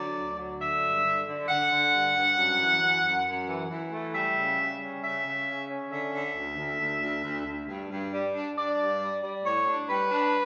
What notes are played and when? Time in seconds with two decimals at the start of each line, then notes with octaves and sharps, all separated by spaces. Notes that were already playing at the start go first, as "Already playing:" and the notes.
Already playing: D3 F#3 D5
0.16 D2
0.38 F#3
0.60 D3 E5
0.83 G2
1.04 D3
1.27 D3
1.48 D3 F#5
1.70 D3
1.93 G2
2.15 G2
2.37 F#2
2.59 E3
2.81 F#2
3.03 F#2
3.26 F#2
3.48 E3
3.70 E3
3.92 A3
4.13 G3 E5
4.36 C#3
4.59 G3
4.80 C#4
5.03 C#3 E5
5.24 C#3
5.46 C#4
5.69 C#4
5.91 D3 E5
6.13 D3
6.35 D2
6.57 D2
6.80 D2
7.01 D2
7.24 D2
7.46 D2
7.68 G2
7.90 G2
8.12 G3
8.34 D4
8.56 D4 D5
8.78 G2
9.00 G3
9.23 G3
9.45 A2 C#5
9.67 D4
9.89 G3 B4
10.11 D4